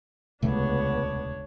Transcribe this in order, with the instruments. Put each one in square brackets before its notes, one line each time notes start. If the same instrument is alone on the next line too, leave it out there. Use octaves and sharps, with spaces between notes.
[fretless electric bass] D#1 C3 A3 [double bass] C#2 B3 [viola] D4 C#5